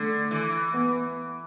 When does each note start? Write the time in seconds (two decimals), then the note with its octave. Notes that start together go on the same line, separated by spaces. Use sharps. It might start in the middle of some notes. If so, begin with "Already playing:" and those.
Already playing: D3 A3
0.31 E3
0.73 B3